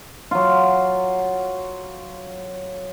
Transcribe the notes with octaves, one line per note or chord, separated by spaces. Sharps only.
F#3 F4